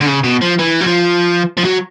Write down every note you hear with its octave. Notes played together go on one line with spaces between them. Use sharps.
D3
C#3
B2
F3
E3
F#3
F3
F3
F#3